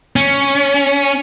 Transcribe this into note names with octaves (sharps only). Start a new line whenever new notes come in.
C#4